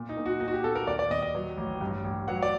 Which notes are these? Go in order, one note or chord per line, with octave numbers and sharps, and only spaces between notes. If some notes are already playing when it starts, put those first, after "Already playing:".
Already playing: A#2
D#4
A#2
F#4
A#2 D#4
F#4
G4
A#2 A4
A#4
D#2 D5
D5
D#2 D#5
D#5
F#3
A1
G2
A1
F#3 F#5
D5